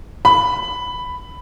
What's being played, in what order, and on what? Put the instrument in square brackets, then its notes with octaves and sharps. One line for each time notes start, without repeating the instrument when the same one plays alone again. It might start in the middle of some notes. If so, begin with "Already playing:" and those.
[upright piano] B5